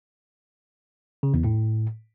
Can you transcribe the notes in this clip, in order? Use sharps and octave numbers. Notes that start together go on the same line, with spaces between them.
C#3
E2
A2